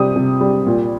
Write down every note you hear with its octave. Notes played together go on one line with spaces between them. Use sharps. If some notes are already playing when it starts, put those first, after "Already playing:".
Already playing: C3 G3 D#6
C3
G3
A#2